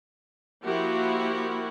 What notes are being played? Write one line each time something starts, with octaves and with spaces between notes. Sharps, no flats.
F3 A#3 E4 F#4 G4